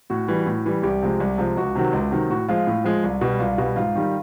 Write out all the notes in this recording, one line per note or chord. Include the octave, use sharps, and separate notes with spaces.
A2 F#4
E3 G3
A2
E3 G3
C2 G4
C3 F3 G#3
C2
C3 F3 G#3
C#2 F#4
C3 D#3 F#3
C#2
C3 D#3 F#3
A2 F#4
F3 G#3 F4
A2
F3 G#3
C2
B2 G3
C2 F4
B2 G3
G#2 F4
D#3 G3